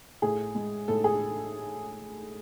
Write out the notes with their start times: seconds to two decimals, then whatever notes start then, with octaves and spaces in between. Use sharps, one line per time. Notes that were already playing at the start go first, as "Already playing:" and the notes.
0.22 A2 G#4
0.55 G#3
0.88 A2 A4
1.04 G#4